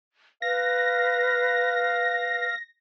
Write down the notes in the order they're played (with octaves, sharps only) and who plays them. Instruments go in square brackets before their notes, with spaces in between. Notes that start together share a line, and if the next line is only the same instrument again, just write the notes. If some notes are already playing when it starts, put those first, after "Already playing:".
[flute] B4 [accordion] F5 [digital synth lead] A#6